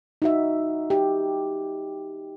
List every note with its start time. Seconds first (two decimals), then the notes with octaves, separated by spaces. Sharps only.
0.22 D#4 F#4 E5
0.90 G4